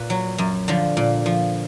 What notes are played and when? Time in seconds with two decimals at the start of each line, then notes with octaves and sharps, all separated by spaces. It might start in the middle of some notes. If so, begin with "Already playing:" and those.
Already playing: A#2 B4
0.10 F#3
0.38 F#2
0.68 D3 F3
0.97 A#2
1.26 F3